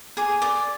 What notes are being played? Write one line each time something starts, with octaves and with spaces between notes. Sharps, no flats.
G#4 D6
D5 D6